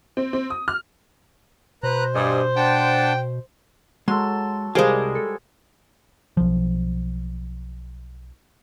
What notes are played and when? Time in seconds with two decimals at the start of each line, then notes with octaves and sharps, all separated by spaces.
0.17 C4
0.33 C4
0.50 D#6
0.68 F6
1.83 B2 B4 C5 A#5 F#6
2.15 G2 D#5 G#5
2.56 D4 F#5 G5 A5
4.08 F#3 G#3 A4 C6
4.75 C2 G3 G#3 G#4 A#4 C5 F5 G#5
5.15 A4
6.37 B1 F3